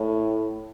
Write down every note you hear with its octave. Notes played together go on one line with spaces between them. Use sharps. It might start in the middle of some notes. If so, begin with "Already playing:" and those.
Already playing: A2